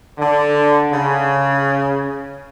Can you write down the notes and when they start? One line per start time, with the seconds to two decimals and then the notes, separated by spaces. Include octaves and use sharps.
0.18 D3
0.93 C#3